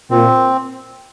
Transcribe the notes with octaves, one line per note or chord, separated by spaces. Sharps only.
A#2 C4